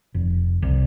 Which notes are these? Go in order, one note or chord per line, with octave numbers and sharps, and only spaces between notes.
F1
C2